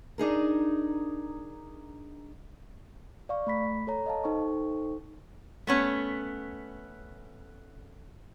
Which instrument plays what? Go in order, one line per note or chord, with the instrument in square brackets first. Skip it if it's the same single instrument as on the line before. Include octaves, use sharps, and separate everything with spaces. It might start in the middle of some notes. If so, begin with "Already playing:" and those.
[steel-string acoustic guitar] D4 D#4 G#4 A#4
[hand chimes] D5 F5 C#6
A3 B5 B6
A4 C#5 A#5
D#5 F5 A5
D#4 A4 C5 G5 C#6
[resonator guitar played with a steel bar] A3 B3 C#4